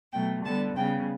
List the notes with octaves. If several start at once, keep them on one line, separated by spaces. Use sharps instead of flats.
B2 F#3 A3 G5
D3 G3 B3 A5
C#3 G3 B3 G5